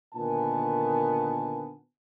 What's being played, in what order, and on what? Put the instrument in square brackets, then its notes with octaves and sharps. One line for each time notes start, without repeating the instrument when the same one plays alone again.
[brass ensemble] A#2 D3 D#3 B3 G#5 A5